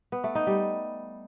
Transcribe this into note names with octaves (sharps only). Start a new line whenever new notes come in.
B3
A3
D#4
G3